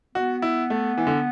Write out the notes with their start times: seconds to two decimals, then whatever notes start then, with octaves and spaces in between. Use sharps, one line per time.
0.15 B3 F#4
0.42 E4
0.70 A3
0.98 E3
1.07 D3